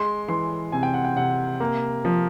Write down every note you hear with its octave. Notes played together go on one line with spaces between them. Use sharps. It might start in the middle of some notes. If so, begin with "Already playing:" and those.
Already playing: G#3 C6
E3 C6
C3 G#5
G5
F#5
G5
C3 F#5
A#3
F3